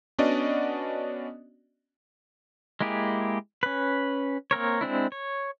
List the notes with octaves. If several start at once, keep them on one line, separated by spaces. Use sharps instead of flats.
B3 C#4 D4 F#4 D5 D#5
G#3 A#3 E4 G4 G#4
C#4 B4
A#3 C4 A#4 C#5
G#3 C4 D4 E4
C#5